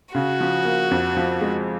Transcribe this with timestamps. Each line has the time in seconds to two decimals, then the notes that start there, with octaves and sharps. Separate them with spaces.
0.15 C#3 F#4
0.40 F3
0.65 A#3
0.91 F2
1.17 F3
1.41 G#3